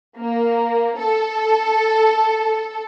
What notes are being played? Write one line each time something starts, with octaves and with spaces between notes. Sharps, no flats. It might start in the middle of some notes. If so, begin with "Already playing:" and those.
A#3
A4